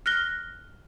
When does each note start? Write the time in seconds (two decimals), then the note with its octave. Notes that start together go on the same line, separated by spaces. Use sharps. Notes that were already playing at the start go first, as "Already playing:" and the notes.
0.06 F6 F#6 A#6 G7